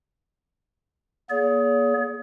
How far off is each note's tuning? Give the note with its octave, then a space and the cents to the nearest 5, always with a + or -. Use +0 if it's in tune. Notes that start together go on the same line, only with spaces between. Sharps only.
A#3 +40 G#4 +15 C#5 +45